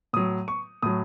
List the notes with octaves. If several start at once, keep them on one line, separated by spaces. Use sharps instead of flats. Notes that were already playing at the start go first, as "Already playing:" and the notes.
A2 F#3 D#6
C#6
A2 F#3 D#6